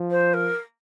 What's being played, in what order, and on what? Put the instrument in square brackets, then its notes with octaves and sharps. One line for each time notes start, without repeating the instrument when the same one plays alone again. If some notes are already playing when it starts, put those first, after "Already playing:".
Already playing: [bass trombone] F3
[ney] C5
A#4